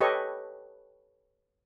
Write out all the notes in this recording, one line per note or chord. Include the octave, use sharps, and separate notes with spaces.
G4 A4 B4 C#5 D#5 C#6